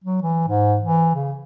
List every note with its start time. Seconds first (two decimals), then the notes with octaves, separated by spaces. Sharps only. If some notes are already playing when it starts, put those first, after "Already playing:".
0.04 F#3
0.22 E3
0.48 G#2
0.81 E3
1.15 C#3